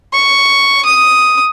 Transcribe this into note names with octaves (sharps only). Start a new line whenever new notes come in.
C#6
D#6